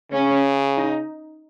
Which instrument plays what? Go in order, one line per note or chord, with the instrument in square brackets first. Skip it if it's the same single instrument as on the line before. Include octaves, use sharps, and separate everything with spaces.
[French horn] C#3 [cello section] C#4
[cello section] D#4